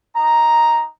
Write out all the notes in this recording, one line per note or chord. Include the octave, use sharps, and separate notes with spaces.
D#4 A#5